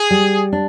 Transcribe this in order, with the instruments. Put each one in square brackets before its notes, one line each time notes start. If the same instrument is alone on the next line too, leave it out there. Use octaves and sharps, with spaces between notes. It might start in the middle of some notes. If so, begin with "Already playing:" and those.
Already playing: [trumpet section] G#4
[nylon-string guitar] G3
D4